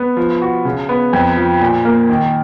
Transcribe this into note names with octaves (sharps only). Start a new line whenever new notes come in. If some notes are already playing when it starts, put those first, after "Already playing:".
Already playing: B3
F3
F#4
C#3
B3
F2
F3
A#2
A#3
D#3